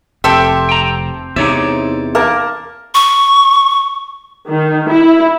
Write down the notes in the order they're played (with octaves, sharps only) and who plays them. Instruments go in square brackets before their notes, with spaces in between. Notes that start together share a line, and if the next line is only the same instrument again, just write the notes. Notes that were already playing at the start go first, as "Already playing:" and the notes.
[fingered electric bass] F1 [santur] C4 [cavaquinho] G4 A4 E5
[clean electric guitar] G5 A#5
[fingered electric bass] E2 C3 [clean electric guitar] D#4 C#5 E5 [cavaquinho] D5
[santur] A#3 A#4 A5
[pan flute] C#6
[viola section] D#3
E4